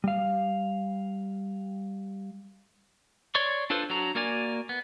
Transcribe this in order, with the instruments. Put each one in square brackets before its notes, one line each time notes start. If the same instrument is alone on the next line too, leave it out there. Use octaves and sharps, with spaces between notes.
[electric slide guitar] G3 F5
[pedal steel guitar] C#5 D5 C6 C#6
D4 F4 A4 B4 C5
F#3 D4 F#4 A#5
A#3 F#4 A#4 D5 G#5
B3